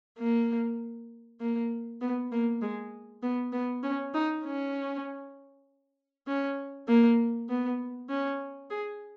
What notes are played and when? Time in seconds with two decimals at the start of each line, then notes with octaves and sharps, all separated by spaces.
0.18 A#3
1.40 A#3
2.01 B3
2.32 A#3
2.61 G#3
3.22 B3
3.52 B3
3.83 C#4
4.14 D#4
4.44 C#4
6.27 C#4
6.88 A#3
7.49 B3
8.09 C#4
8.70 G#4